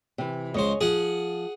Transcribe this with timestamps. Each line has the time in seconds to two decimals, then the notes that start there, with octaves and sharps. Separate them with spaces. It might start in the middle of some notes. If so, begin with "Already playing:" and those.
0.18 C3 E3
0.55 C#2 G#4 C5 C#5 D#5
0.81 F3 G#4 F#5